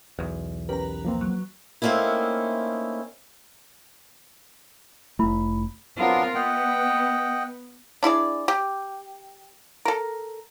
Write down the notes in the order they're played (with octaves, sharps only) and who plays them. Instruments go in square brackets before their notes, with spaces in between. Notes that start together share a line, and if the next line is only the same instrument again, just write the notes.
[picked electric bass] B1 E2
[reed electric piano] C#4 G4 A#4 [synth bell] B4 A#5
[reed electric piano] F3 A#3 C4
[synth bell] F#3
[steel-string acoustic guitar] A3 A#3 C4 C#4 D#4 E4
[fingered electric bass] F1 A3 [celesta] E4 B5
[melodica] F#3 B3 D4 [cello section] C4 F4 A#4
[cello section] B3 [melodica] D#5 F#5 G5
[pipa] D4 E4 G#4 D5
G4
A4 A#4